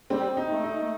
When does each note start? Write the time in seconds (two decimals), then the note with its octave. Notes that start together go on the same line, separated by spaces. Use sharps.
0.10 G3 C4
0.37 D#4
0.50 A3
0.64 D#4